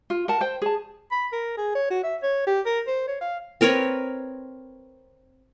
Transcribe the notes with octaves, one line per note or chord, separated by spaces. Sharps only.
F4
A#4 F#5 A5
C5 G5
G#4 A5
B5
A#4
G#4
C#5
F#4
E5
C#5
G4
A#4
C5
C#5
F5
C4 A#4 B4 C#5